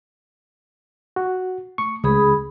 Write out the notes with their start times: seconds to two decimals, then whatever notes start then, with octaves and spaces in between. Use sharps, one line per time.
1.16 F#4
1.78 A3 C#6
2.04 C#2 G#4 B5 D#6